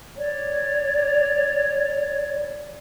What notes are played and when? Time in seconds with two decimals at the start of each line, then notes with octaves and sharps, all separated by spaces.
0.18 C#5 D5